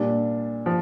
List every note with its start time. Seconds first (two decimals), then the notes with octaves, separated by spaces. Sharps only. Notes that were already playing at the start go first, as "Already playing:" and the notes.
Already playing: A#2 G3 D4
0.66 F3